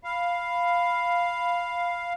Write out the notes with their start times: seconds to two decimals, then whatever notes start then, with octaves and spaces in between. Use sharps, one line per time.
0.04 F5 B5